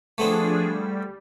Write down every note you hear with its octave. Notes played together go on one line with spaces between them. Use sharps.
F3 A3 B3 C4 D4 G#4
G3